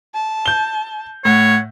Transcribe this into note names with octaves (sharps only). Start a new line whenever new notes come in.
A5
G6 G7
A2 C#5 F#5